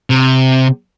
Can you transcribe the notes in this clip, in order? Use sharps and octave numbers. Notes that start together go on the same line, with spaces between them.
C3